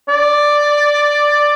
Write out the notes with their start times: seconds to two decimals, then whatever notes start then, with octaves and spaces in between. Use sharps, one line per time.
0.09 D5